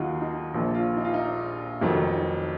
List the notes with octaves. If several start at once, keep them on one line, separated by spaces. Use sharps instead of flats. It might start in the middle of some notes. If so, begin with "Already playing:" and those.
Already playing: D#2 D#3 F#3 D#4 F4 F#4
D#4
A#1 A#2 F3
F4
D#4
F4
D#4
F1 F2 D#3 F#3